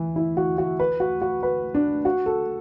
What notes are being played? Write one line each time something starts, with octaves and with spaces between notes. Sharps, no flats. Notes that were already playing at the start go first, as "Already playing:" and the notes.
Already playing: E3
E4
F#4
F#4
B4
F#4
F#4
B4
D4
F#4
A4